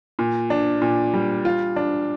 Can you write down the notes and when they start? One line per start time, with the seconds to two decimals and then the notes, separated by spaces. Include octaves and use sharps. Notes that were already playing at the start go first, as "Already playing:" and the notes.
0.19 A#2
0.50 D4
0.82 A#2
1.14 G3
1.45 F4
1.76 D4